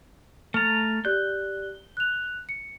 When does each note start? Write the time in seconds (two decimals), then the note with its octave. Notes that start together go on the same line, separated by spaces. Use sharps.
0.54 A3 A#5 F6 A6
1.05 G4 D5 F#6 G6
1.97 F#6 F7
2.49 C#7